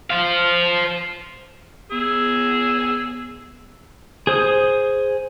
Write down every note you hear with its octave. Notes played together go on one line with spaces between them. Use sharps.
C5 F5
B3 G#4 E6
G#4 C5 D#6